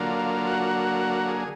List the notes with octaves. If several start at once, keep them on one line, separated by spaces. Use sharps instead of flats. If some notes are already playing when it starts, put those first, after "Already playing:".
Already playing: D3 F#3 A#3 F4
F#4
G#4